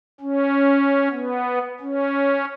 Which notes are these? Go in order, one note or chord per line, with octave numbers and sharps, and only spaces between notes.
C#4
B3
C#4